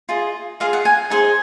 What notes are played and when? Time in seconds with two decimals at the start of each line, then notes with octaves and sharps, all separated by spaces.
0.09 F4 G#4 D#5
0.60 F4 G#4 D#5 F5
0.73 F#5
0.85 G#5
1.10 D#4 G#4 C5 D#5 G#5